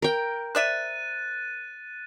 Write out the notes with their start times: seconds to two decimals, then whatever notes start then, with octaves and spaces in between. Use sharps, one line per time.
0.02 A#4 G5
0.55 C5 D5 E5 F#6 A6 D#7